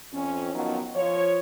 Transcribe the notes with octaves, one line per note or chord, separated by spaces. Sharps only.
F2 C#4
D#3 F3 F#3 B3 C#4 D#4
F3 C#5